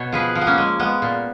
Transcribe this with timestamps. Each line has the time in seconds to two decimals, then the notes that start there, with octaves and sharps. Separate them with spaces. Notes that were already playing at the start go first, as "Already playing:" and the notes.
Already playing: B2 C#5
0.12 F3 G#4 B4
0.35 F3
0.41 B3
0.47 A#3 C#4
0.58 G#3
0.79 G#3 B3
1.02 A#2